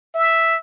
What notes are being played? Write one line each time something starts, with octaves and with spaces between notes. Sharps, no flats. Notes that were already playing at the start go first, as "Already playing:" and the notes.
E5